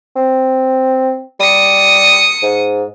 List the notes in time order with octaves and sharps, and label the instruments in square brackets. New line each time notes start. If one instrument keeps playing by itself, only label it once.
[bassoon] C4
[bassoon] G3 [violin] D#6 C#7
[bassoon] G#2